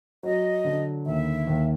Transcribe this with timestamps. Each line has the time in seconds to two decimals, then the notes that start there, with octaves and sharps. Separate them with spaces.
0.23 F#3 D#5
0.65 D3
1.06 D#2 E5
1.47 D#2